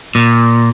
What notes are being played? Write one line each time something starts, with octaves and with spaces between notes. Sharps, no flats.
A#2